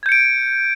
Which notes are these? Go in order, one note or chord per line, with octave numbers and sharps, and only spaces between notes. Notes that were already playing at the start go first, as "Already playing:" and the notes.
G6 G#6 C#7 D7